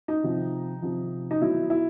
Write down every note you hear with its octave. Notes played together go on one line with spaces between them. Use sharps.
D#4
C3 F3
C3 F3
D#4
B2 F#3 E4
E4